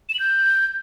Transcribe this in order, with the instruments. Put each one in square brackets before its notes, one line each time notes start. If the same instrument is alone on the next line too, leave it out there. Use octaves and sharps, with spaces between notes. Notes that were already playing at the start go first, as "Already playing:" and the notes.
[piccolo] E7
F#7
G6